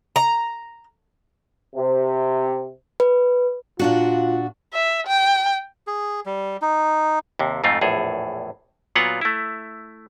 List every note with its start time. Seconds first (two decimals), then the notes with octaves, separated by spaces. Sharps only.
0.16 A#5
1.75 C3
3.00 B4
3.79 A#2 D4 F4 F#4
4.73 E5
5.07 G5
5.87 G#4
6.26 G3
6.62 D#4
7.39 D#2 C3
7.64 F2 G#2 A3 C4 F4
7.81 A#1 E2 A2 G#4 A4
8.95 A#2 F#3 B3 F4 C#5 F#5
9.21 A3 E4